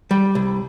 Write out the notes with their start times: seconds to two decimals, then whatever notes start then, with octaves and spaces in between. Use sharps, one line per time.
0.11 G3
0.35 C2